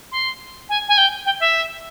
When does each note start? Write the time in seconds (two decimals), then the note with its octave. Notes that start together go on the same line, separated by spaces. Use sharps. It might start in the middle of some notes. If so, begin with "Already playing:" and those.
0.11 C6
0.69 G#5
0.88 G#5
0.97 G5
1.25 G5
1.40 E5